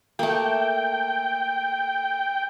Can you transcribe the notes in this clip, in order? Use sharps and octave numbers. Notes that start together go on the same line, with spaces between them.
A3 A#3 G5